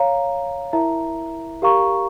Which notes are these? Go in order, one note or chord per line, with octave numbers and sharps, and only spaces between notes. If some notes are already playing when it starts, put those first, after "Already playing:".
Already playing: C#5 F5 A#5
E4 A#4 E5 A#5
G4 A#4 F5 A#5 C#6